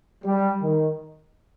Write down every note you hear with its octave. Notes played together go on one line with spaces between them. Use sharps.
G3
D#3